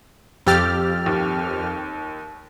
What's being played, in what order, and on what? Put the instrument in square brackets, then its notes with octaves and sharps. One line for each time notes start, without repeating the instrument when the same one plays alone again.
[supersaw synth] F2 G4 F6 [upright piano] E6 A6
[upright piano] D#2